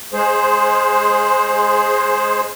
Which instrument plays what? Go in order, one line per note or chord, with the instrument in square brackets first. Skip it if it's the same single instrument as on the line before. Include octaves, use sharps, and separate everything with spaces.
[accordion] G#3 G#4 C5